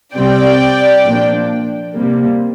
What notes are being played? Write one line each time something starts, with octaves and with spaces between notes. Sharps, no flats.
C3 G3 C4 D5 G5
A#2 F3 A#3 D4
C3 G3 A#3